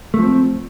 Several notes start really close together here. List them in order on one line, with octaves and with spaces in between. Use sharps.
A3 F3 C4